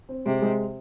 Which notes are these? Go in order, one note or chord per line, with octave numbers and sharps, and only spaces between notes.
C4
C3 G#3
G#3